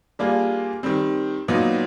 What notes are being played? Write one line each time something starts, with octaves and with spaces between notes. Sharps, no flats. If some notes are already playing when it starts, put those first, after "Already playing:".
G3 A#3 D4 F4 G#4
D#3 G3 C4
A#2 F#3 B3 D#4